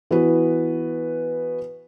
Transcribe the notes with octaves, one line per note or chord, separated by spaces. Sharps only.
E3 B3 F#4 B4